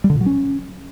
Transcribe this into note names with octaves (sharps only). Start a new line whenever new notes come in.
G3
D3
A#2
F#3
C#4